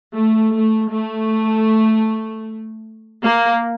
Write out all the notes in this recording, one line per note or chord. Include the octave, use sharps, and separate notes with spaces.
A3
A3
A3
A#3